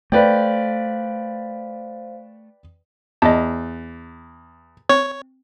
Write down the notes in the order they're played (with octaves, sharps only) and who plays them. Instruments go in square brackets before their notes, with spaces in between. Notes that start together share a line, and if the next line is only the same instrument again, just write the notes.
[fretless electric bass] A3 [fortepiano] B4 D5 G5 [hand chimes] C5 F5
[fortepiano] E2 [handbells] D#5 A5
[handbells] C4 [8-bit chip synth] C#5